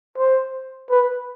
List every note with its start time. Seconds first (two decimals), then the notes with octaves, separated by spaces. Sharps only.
0.18 C5
0.90 B4